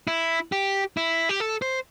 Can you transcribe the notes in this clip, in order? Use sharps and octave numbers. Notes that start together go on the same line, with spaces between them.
E4
G4
E4
G4
A4
C5